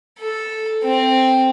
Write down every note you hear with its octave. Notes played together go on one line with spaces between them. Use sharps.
A4
C4